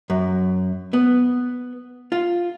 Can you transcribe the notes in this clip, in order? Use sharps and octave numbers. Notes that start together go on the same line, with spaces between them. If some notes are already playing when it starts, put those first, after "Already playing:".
F#2
B3
F4